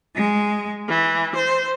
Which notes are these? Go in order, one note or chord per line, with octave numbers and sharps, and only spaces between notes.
G#3
E3
C5